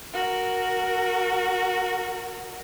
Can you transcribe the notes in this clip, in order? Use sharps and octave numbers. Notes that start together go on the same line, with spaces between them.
F#4 A#4